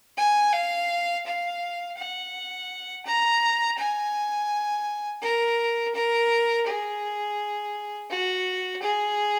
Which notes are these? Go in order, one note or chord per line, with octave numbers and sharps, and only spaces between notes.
G#5
F5
F5
F#5
A#5
G#5
A#4
A#4
G#4
F#4
G#4